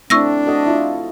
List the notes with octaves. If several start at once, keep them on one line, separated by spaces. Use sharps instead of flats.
A3 C4 D4 E4 C#6 E6 A#6
F#4 A4 D#5
E4 F4